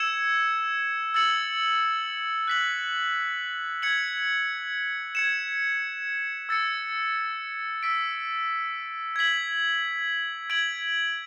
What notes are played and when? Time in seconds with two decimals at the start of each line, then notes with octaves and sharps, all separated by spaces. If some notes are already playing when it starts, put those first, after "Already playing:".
Already playing: E6 G#6 C#7 E7
1.14 E6 A6 C#7 F#7
2.48 F#6 B6 F#7
3.82 G#6 C#7 F#7
5.15 G#6 C#7 E7
6.49 E6 A6 C#7
7.83 E6 B6 D7
9.16 G#6 B6 F#7
10.50 G#6 D7 F#7